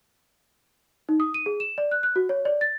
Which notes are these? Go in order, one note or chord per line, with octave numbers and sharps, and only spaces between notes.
D#4
D#6
D#7
G#4
E7
D5
F#6
F#6
F#4
C#5
D5
A6